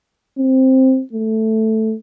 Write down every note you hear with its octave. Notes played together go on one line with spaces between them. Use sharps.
C4
A3